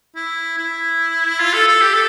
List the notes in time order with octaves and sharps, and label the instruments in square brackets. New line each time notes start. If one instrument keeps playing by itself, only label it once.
[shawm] E4
E4
F4
A4
A4
G4
A4